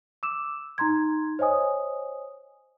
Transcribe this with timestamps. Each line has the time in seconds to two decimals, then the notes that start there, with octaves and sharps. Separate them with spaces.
0.23 D6 E6 E7
0.78 D#4 A#5 C6 G#6
1.39 C5 C#5 D#5 G#5 D#6